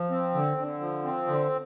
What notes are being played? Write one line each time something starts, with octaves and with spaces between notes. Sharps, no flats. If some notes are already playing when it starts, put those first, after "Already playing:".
Already playing: F3
C4
D3
D3
F3
C4
D3